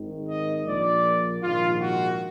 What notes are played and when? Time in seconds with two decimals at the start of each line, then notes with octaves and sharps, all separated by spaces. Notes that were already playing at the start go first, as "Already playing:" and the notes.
Already playing: G#1 G#2 D#3
0.28 D#5
0.66 A#1 A#2 D5
1.43 A#1 G#2 D#3 F4
1.82 F#4